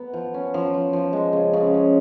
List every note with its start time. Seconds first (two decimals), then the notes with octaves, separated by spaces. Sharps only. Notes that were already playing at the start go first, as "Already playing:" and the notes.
Already playing: B3
0.13 F3
0.34 C#4
0.54 F3
0.74 F3
0.93 F3
1.13 G#3
1.33 C#3
1.53 C#3
1.74 C#3